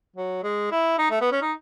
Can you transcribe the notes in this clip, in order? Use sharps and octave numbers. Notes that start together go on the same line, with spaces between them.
F#3
G#3
E4
D#4
A3
B3
C#4
D#4